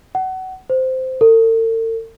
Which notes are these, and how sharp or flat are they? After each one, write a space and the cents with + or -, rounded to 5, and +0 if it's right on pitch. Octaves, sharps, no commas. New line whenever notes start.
F#5 +25
C5 -10
A4 +45